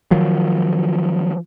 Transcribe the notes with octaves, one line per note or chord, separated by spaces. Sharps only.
D#3 F3 F#3